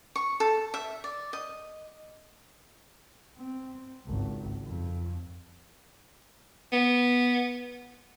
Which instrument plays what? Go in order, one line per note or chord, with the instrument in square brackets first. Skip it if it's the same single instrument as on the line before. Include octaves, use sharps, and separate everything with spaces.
[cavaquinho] C#6
A4
E5
D5
D#5
[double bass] C4
G#1 C#2
F2
[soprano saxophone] B3